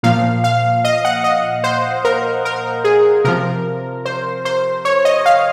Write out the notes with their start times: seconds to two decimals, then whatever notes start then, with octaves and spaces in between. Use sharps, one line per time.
0.03 A#2 F3 F5
0.44 F5
0.84 D#5
1.05 F#5
1.24 D#5
1.64 C5
2.05 A#4
2.45 A#4
2.84 G#4
3.25 C3 F3 A#4
4.05 C5
4.45 C5
4.85 C#5
5.05 D#5
5.26 F5